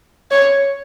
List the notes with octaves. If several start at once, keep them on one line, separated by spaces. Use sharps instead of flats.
C#5